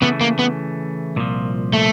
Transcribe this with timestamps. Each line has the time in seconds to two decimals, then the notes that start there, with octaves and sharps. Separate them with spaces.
0.02 C#3 E3 A3 B3
0.21 A#3
0.39 B3
1.16 C2 A#2 F3
1.73 A3